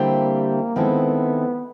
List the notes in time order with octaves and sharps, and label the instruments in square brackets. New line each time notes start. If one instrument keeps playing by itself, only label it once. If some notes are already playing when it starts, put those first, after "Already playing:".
Already playing: [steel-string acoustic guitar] D3 G3 C4 E4 G4 [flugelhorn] A#3
[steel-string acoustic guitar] D#3 G#3 C4 E4 A4 [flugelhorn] B3